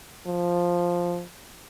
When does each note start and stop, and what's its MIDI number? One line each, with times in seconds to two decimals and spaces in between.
0.27 1.24 53